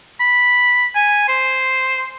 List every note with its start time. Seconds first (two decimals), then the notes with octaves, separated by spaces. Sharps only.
0.20 B5
0.95 G#5
1.28 C5